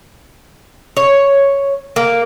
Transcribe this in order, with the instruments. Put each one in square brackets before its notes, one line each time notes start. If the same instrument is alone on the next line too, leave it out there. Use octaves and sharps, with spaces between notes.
[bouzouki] C#5
A#3